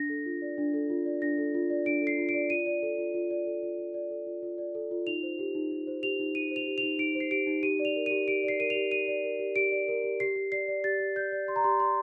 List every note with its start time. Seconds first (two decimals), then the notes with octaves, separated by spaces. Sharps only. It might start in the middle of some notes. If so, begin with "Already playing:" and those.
Already playing: D4 A#6
0.09 A4
0.25 F4
0.42 D5
0.58 D4
0.74 A4
0.90 F4
1.06 D5
1.22 D4 A#6
1.38 A4
1.55 F4
1.70 D5
1.86 D4 D7
2.02 A4
2.07 C7
2.18 F4
2.29 D7
2.34 D5
2.50 F4 D#7
2.66 D5
2.82 A4
2.98 F4
3.14 F4
3.30 D5
3.47 A4
3.63 F4
3.78 F4
3.94 D5
4.11 A4
4.26 F4
4.43 F4
4.58 D5
4.75 A4
4.91 F4
5.07 D#4 F7
5.23 C5
5.39 G4
5.55 D#4
5.71 D#4
5.87 C5
6.03 G4 F7
6.19 D#4
6.35 D#4 D#7
6.51 C5
6.56 F7
6.67 G4
6.78 F7
6.83 D#4
6.99 D#4 D7
7.15 C5
7.20 C7
7.31 G4 D7
7.47 D#4
7.63 G4 D#7
7.79 D5
7.85 F7
7.96 A#4
8.06 D#7
8.11 G4
8.28 G4 D7
8.44 D5 C7
8.60 A#4 D#7
8.70 F7
8.75 G4
8.91 G4 D#7
9.08 D5
9.24 A#4
9.39 G4
9.56 G4 D7
9.72 D5
9.88 A#4
10.04 G4
10.20 G4 C7
10.36 G4
10.52 D5 C7
10.68 D5
10.84 G4 A6
11.00 G4
11.16 D5 G6
11.32 D5
11.48 G4 C6
11.56 A#5
11.64 G4 C6
11.80 D5 C6